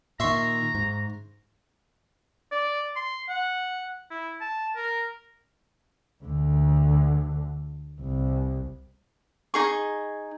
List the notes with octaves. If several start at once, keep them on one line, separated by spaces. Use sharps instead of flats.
A#2 D#3 E5 A#5 C6 C#6
G#2
D5
C6
F#5
E4
A5
A#4
D2 D3
C2
D#4 G#4 C#6